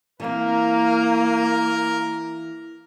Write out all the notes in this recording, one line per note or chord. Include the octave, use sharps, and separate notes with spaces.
E3 A#3 C4 A#4